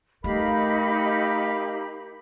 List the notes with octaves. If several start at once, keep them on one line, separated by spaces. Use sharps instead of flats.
A3 D#4 G4 A#4 D#5 F5 B5